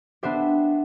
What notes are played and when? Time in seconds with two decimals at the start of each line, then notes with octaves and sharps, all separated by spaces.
0.23 B3 D4 G4 C5 E5